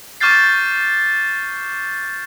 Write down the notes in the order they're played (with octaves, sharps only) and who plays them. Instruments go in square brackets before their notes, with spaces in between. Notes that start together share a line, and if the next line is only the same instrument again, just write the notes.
[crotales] C#6 D6 F6 G6 A6 C7